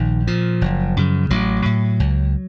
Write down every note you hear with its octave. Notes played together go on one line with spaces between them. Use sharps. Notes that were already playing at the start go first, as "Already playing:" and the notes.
Already playing: A#1 D#3
A#2 F3
F#1
F#2 C#3
A1 F#3
A2
C#2